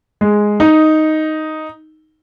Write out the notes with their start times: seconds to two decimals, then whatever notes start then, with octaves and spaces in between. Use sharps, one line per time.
0.21 G#3
0.60 D#4